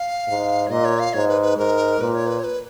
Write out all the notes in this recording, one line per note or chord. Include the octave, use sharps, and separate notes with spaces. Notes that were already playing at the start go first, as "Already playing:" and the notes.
Already playing: F5
G#2
C#5
A#2 D#5
C#5
F5
G#2 C#5
B4
B4
G#2 A#4
A#2 B4
C#5
B4
C#5
B4